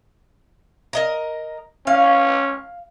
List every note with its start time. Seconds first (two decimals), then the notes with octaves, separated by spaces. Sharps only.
0.93 A#4 D#5 A#5
1.87 C#4 F5